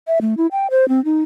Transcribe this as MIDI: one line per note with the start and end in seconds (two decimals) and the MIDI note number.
0.07 0.19 76
0.21 0.34 57
0.37 0.47 64
0.52 0.67 79
0.71 0.88 72
0.89 1.03 60
1.05 1.22 63